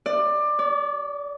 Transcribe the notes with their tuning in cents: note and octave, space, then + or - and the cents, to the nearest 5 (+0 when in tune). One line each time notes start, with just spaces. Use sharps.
D5 +20
D5 -35